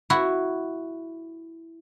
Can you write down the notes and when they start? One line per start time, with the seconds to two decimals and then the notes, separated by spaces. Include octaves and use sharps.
0.10 E4 F#4